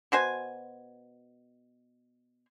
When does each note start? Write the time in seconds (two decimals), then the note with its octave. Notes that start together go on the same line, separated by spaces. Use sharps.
0.12 B2 F#4 C5 G#5